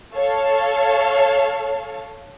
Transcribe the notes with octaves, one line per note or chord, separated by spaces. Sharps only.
A4 C#5 F5